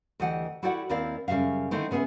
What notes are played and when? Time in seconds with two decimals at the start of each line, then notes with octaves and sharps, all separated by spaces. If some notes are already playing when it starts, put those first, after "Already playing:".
0.20 D2 E3 G4 D#5 F#5
0.63 E4 F#4 G4 A4 D5 F#5
0.89 D#2 C4 E4 A#4 D5 F5
1.28 F#2 C#3 G3 E5 F5
1.71 D3 D#3 A3 C4 D#4 E4
1.91 C#3 B3 G#4 B4 E5